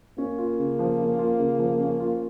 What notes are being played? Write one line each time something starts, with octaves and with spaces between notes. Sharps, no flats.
A#3 C#4
F4
C#3
F3
C#4
F4
C#3
F3
C#4
F4